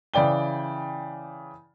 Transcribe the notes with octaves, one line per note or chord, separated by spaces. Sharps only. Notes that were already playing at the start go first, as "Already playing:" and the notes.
C#3 E3 D5 G5 G7